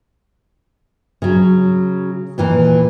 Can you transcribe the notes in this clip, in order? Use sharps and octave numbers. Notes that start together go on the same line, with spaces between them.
C#3 F#3
D#2 A#2 E3